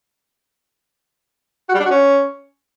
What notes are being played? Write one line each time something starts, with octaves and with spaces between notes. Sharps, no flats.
F#4
G3
D4
F#4
C#4